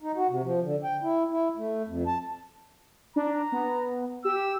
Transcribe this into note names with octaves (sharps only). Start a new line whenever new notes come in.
D#4
F#4
C3
F3
D3
G5
E4
E4
A3
F2
A5
D4 A#5
B3
G4 E6